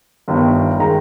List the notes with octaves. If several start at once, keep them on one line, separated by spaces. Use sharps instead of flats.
G1 G2 D#3
D#3 G#3 A#5